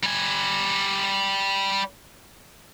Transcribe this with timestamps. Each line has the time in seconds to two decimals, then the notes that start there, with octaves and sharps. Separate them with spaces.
0.03 G3 G#5